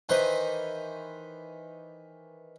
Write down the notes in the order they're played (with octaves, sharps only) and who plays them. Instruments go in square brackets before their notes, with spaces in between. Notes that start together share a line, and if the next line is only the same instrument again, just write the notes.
[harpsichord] D#3 E3 D#4 B4 C5 C6